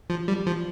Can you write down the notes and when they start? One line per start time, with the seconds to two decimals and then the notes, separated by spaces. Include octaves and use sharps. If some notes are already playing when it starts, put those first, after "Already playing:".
0.10 F3
0.28 G3
0.47 F3